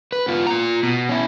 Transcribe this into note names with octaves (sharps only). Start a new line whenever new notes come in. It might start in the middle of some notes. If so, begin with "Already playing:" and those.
B4
B3 F4
F4 A#5
B2
C#4 E4